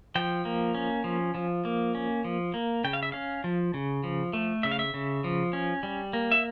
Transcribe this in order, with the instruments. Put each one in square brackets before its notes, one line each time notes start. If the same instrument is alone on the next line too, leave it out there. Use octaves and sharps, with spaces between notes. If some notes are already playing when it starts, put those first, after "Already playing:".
[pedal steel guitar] F3 G5
A#3
C#4
F3
F3
A#3
C#4
F3
A#3
C#3 G5
F5
E5
C#4 F5
F3
C#3
F3
A3
C#3 E5
F5
E5
C#3
F3
C#4
G3
A#3
E5